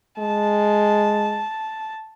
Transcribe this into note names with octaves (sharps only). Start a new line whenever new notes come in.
G#3 A5